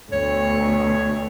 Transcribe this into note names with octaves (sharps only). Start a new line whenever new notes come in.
D2 B2 A3 C#5